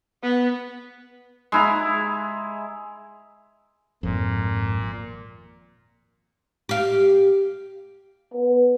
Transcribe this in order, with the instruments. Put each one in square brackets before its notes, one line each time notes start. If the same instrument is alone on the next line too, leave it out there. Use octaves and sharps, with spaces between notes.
[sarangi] B3
[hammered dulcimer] G#3 E4 A#5
[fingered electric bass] G#1 F2 [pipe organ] A#2
[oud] G4 F5
[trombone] B3